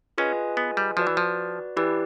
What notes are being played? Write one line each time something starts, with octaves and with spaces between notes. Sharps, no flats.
C#4 F4 G#4 B4 D#5 G#5
B3
G3
F3 F#4 B4 D5
E3
F3
E3 E4 G4 B4 D5